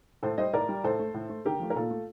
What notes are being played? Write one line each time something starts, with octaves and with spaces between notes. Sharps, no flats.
A2 A4 C5
G3 C5 D#5
A2 A#4 D5
G3
A2 A4 C5
A3
A2
A3
D3 G4 A#4
F3 A3
A#4
A#2 F4 A4
A3